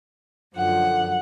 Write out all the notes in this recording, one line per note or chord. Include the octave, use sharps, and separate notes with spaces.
F#2 D3 F3 F#5